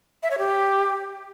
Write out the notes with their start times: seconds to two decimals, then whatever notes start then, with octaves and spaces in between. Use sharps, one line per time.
0.23 E5
0.31 C#5
0.38 G4